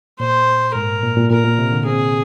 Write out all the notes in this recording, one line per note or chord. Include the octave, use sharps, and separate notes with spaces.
A#2 C5
G#2 A#4
A#2
A#2
A#2 A#4
A#2
C3
D3
C4 G#4